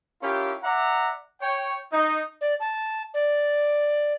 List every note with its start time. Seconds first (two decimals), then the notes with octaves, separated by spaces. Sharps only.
0.22 C#4 E4 F4 G4 A#4
0.63 D5 E5 F#5 A#5
1.41 C#5 G5
1.92 D#4
2.41 D5
2.60 A5
3.14 D5